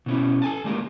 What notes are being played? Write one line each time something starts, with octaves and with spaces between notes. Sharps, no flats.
B2 C#4 E4
A4 G#5 A5
A2 G#3 A#3 G4 A#4